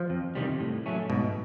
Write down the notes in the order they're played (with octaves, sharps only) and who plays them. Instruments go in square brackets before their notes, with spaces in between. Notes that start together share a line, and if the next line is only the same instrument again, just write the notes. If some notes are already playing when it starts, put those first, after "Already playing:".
Already playing: [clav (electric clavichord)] F3
[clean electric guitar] F2
C3 D#3 G3
A2
F#3 A3 C#4
[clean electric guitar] G#2 [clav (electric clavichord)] B2